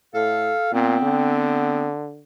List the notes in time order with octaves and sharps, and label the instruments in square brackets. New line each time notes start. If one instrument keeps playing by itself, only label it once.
[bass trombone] A2 [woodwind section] A4 F5
[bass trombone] A#2 [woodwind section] B3 C4
[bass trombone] D3